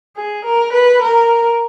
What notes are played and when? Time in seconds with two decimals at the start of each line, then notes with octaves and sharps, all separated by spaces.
0.16 G#4
0.45 A#4
0.73 B4
1.02 A#4